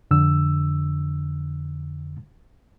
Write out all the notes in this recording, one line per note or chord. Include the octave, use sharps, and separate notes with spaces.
F2 D3 E6